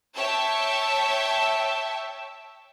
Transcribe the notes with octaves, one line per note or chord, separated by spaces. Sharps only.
C#5 E5 G5 A5